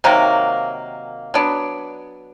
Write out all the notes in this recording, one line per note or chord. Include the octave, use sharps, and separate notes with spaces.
C3 D#3 F#3 A#3
F#3 B3 D4